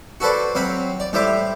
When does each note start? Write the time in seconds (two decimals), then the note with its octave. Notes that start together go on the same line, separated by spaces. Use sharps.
0.20 F#4 A4 B4 C5 D5
0.55 F#3 C4 F5 B5
1.00 D5
1.13 A2 G3 C5 E5 D6